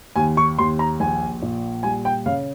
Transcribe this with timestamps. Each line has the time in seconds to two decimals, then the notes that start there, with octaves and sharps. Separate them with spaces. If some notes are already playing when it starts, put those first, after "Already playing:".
0.16 D#2 G#5
0.37 C#6
0.59 D#2 C6
0.79 A#5
1.00 A#1 G#5
1.42 A#2
1.83 G3 G#5
2.05 G5
2.26 C#3 F5